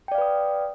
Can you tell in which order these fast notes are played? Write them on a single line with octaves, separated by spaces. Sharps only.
G5 D5 F5 B4 D#6